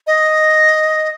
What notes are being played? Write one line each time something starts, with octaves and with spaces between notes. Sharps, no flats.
D#5